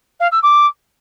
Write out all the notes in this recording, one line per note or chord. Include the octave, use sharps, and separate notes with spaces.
F5
E6
D6